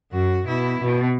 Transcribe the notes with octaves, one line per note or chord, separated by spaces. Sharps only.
F#2 F#4
B2 E4
B2